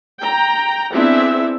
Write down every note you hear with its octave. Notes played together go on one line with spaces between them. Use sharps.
G5 A#5
B3 C4 D4 E4 G#4 E5